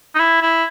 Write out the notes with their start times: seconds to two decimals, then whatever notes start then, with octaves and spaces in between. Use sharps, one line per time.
0.15 D#4
0.19 E4
0.42 E4